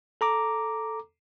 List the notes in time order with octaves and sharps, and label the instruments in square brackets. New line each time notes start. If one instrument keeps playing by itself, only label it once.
[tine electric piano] A4 A#5 D6